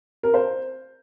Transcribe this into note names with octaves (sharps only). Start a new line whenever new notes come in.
A#4
C5